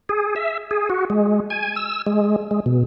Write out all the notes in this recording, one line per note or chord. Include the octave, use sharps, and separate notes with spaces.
G#4
E5
G#4
F#4
G#3
G#5
E6
G#3
G#3
B2